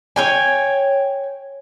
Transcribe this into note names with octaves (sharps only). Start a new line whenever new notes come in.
C#5 G5 G#5